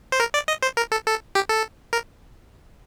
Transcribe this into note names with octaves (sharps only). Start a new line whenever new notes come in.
C5
A#4
D5
D#5
C5
A#4
A4
A4
G4
A4
A#4